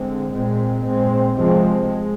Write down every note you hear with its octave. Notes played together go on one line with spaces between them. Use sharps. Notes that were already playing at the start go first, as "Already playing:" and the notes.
Already playing: D3 G#3 C4
A#2 G#3 C4
A#2 G#3 C4
C3 F3 G#3 C4
G#3